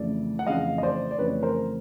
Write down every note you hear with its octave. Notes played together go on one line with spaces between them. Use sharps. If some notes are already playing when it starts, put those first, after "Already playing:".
Already playing: F2 C#3 E3 A3 D5
F#5
F2 C#3 E3 A3 D#5 F5
D#5
C5 D5
D5
F2 C#3 E3 A3 B4 C#5
A#4 C5